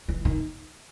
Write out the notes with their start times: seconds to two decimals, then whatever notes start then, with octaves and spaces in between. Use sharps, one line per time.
0.08 E3
0.25 D#3